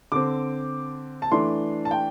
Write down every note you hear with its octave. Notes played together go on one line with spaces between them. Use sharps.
D3 C4 D6
A5
E3 A3 D4 C6
A5
G5